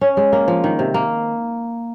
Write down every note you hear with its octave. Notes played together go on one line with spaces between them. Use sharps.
C#4
G#3
A#3
F3
D#3
C3
A#3